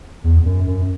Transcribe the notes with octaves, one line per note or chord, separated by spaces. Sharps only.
E2
F#2
F#2